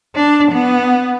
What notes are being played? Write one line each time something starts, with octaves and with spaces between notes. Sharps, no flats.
D4
B3